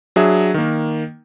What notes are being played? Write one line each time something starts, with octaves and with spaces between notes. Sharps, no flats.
F#3 D4 G#4 E5
D#3 A#3